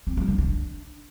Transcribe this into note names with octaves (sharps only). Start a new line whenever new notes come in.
C4
G3
D3
D4